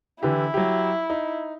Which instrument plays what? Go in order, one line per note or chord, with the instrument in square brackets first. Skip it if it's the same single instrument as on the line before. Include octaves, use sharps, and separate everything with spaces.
[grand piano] D3 E3 G4 [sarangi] E4
[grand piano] F#3 G4
D#4